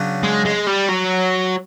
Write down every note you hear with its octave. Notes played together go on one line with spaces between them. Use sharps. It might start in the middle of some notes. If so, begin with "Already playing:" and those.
Already playing: C#3 F#3 B3 D4
G#3
G#3
G3
F#3